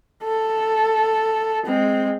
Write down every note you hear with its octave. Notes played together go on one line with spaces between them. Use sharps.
A4
G#3 C4